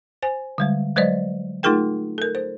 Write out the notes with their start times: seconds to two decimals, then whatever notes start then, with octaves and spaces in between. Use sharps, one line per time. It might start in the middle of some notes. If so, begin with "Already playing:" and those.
0.22 C5 G#5
0.58 D3 G3 G#3
0.96 F#3 G#3 B4 C5 D5 D#5
1.63 A3 D#4 F4 G#4 A#4 G5
2.18 A4 A#4
2.35 C5